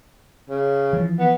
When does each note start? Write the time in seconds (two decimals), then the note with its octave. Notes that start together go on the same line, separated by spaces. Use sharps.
0.50 C#3
0.93 E3 F3
1.19 B3